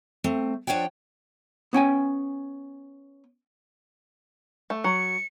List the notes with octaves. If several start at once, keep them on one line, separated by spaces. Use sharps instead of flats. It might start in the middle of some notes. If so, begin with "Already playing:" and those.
A3 C4
F3 D4 C#5 F#5 G5
B3 C#4 G5 G#5
A3
F#3 C#7